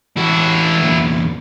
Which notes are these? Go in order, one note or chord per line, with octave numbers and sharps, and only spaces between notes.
E3 E4 F#4 A4
E2 A#2